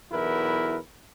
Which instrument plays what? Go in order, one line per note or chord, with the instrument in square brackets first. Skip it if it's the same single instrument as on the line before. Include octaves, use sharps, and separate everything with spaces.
[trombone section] B1 E2 E4 A#4 B4